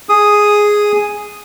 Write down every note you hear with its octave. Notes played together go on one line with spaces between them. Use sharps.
G#4 D#6